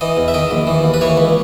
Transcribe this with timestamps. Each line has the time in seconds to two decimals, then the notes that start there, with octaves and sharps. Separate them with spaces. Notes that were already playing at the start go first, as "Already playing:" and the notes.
0.01 E3 D#5
0.17 E2
0.28 E5
0.34 D#3 D#5
0.51 A#1
0.67 E3
0.84 D#2
0.94 B4
1.01 E3 C#5
1.17 C#2